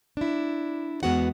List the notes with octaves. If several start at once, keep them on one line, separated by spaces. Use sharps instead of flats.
D4 E4
E2 G#3 B3 F#4 F#5